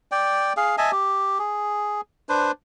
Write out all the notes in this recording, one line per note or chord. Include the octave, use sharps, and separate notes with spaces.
D5 G5
G#4 F5
D#5 E5 G#5 A5
G4
G#4
D4 B4 C5